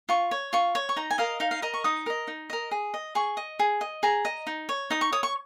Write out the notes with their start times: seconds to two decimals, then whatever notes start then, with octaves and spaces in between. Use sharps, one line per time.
0.09 F4 C#6
0.31 C#5
0.53 F4 C#6
0.75 C#5
0.89 C#6
0.96 D#4 A#5
1.11 G#5
1.18 A#4 D#5 F5
1.40 D#4 F5
1.51 F5
1.62 A#4 D#5 A#5
1.74 C#6
1.84 D#4 D#6
2.06 A#4 D#5
2.28 D#4
2.50 A#4 D#5
2.71 G#4
2.94 D#5
3.15 G#4 C#6
3.37 D#5
3.59 G#4
3.81 D#5
4.03 G#4 A#5
4.25 D#5
4.47 D#4
4.69 C#5
4.90 D#4 D#6
5.01 C#6
5.13 C#5 D#6
5.23 C#6